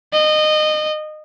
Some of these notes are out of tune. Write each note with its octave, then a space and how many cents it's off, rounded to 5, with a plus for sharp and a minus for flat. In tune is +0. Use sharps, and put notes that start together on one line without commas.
D#5 -20